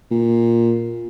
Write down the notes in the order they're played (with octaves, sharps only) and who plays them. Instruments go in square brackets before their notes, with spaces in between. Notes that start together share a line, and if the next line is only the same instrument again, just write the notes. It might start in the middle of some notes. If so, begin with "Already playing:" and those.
[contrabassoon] A#2